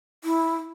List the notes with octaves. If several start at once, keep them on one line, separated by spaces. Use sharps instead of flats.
E4